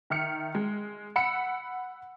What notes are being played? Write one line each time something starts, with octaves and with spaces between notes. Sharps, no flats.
D#3 E5 F6 C#7
G#3
F#5 B5 E6 C#7